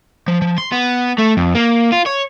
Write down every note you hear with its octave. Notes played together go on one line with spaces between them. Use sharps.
F3
F3
C6
B3
A3
F2
A#3
F4
C#5